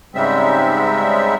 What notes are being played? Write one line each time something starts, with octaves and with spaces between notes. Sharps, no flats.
G#2 C#3 G3 G#3 C4 E5